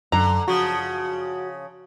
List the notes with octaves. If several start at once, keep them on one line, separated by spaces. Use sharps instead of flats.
F#2 D3 A#5
C#3 F3 F#4